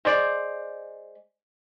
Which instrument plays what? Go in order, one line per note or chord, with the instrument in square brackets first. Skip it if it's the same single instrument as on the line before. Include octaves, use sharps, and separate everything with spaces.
[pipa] G#3 C5 D5